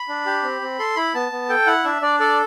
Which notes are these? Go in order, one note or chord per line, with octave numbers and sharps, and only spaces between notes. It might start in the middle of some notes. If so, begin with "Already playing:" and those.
Already playing: B5
D4
G4
C4
C4
A4 C6
E4 B5
B3 A5
B3
A4 G5
E4 F#5
D4 E5
D4 D5
A4 D5